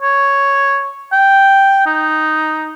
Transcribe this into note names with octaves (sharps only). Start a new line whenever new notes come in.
C#5
G5
D#4